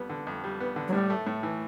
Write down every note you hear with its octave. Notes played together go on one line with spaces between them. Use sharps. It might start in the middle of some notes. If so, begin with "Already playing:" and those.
Already playing: F2 G3 B3
D3
F2
G3
B3
D3
F#3
A2 G3
A3
A2
E3